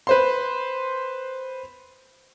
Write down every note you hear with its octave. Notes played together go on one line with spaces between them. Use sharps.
B4 C5 C6